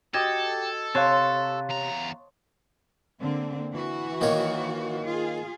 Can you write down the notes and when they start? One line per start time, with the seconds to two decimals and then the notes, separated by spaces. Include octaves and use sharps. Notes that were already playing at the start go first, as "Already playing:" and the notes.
0.14 F#4 G4 A4 D#5 D6 D#6 G#6
0.95 C3 C#5 F5 A5 C6 F#6 A6
1.69 E2 A#5
3.21 D3 A#3 C4
3.72 E3 F#4
4.21 D#3 A#3 C#5
5.05 F4 G#4